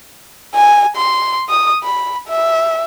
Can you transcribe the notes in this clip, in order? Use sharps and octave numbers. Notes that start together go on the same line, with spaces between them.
G#5
C6
D#6
B5
E5